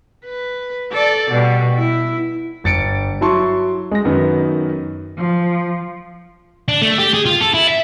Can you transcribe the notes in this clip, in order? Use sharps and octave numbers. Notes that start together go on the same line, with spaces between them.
B4
A4 D5
B2 G3
E4
G1 A6 C#7 D7
F#3 E4 A5 C6 C#6
G#3 A#6
F#2 D#3 B3
F3
D4
A3
G4
G#4
F4
A4
E4
E5